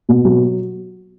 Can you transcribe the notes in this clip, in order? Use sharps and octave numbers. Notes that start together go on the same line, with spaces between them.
B2
F#3